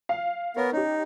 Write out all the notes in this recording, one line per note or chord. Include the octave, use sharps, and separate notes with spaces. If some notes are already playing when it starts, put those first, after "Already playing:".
F5
B3 A#4 C#5
C#4 D#4 G4